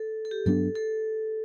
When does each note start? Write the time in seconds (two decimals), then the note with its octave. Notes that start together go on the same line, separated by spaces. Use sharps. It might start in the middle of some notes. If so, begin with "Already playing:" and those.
Already playing: A4
0.25 A4
0.31 G4
0.46 G2 F#3 B3 D4 A4
0.75 A4